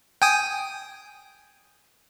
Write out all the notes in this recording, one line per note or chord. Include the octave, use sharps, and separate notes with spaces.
G5 G#5 D#6